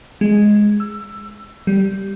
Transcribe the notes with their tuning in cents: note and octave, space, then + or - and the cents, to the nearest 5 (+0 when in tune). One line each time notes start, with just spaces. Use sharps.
G#3 +0
E6 +20
G3 -10